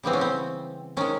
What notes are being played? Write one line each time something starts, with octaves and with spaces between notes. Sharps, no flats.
C#3 E3 G3 B3 C4
C#4
C4
C3 D#3 G#3 C#4